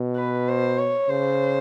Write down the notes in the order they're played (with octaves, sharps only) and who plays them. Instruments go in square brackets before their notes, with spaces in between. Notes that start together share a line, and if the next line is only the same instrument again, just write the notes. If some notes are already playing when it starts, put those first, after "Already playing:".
Already playing: [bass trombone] B2
[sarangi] B4
C5
C#5
[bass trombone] C#3 [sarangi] C5